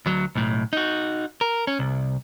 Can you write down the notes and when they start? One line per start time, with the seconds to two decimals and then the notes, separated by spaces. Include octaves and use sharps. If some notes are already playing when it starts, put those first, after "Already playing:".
0.06 D2 F#3
0.35 B1 A2
0.73 D#4 F#4
1.41 A#4
1.67 C#4
1.79 C2